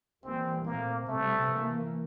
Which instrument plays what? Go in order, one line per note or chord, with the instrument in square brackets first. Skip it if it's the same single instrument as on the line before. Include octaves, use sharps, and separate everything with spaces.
[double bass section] E3 G3 A#3 [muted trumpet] C4
[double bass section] A#2 A3 C4 [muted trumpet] A#3
[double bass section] C3 G3 C4 [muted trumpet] A3
[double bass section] E3 A#3